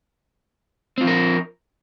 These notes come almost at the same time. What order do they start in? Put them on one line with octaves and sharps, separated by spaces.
C4 F4 F3 A#4